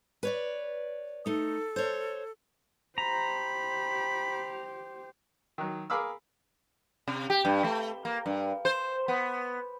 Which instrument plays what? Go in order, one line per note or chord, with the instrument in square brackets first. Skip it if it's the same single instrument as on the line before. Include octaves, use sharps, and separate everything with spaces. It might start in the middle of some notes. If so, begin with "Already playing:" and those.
[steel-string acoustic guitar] B4 C#5 D5
[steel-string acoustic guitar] A3 D#4 [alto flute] A4
[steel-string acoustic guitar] C5 C#5
[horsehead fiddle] G4 C5 [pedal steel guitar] A#5 [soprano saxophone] B5
[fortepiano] D#3 F#3
G#4 A#4 F5 B5 D6 E6
[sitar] C3
G4
G2
A3
A#3
G2
C5
B3